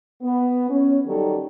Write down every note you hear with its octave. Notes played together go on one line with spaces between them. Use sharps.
B3
C#4
D#3 F#3 G3 D#4 G4 A4